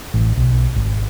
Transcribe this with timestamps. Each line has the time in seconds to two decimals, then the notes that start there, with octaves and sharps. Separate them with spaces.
0.14 A1
0.37 B1
0.76 G#1